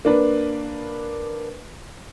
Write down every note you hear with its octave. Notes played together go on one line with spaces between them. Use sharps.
A#3 D4 B4